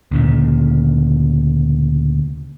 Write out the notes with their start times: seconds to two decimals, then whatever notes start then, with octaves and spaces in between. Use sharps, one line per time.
0.11 D2 A#2 C#3